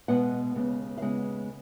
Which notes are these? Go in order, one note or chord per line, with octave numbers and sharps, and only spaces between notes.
B2 G#3 B3 F#5
D#2 C#3 G#3 B3
F5
D#2 C#3 G#3 B3 F#5